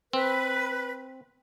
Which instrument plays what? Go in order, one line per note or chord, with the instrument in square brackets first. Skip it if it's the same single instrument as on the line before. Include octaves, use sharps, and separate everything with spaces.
[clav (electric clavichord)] C4 [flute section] B4